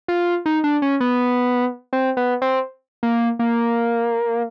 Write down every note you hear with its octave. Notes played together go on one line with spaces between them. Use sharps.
F4
D#4
D4
C#4
B3
C4
B3
C4
A#3
A#3